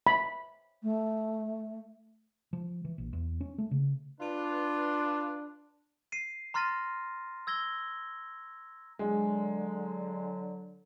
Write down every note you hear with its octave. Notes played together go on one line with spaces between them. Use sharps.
B5
A3
F3
E3
A#1
E2
C#4
A3
C#3
D4 F4 B4
C7 D#7
A#5 C6 F6 A6 A#6 D#7
E6 G#6 A#6 G7
D3 F#3 G#3